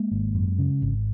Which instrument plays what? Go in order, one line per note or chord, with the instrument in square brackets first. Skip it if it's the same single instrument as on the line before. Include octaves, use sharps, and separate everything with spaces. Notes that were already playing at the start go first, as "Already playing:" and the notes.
Already playing: [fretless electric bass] G#3 A#3
G#1
F#2
C#3
G#1